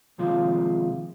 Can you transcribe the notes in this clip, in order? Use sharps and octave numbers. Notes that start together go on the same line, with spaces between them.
D#2 C3 F3 G#3 F4